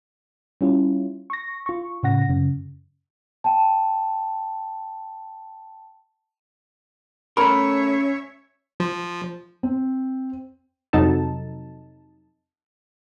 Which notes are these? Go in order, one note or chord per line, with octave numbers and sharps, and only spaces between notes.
G3 C#4 E4 F4
C#6 A#6
F4 C#6
A2 C#3 F#5 A#6
F#2 C#3
G5 A5
A3 C#4 A#4 C#5 E5 B5
F3
C4
F2 C3 F#3 D#4 A4 A5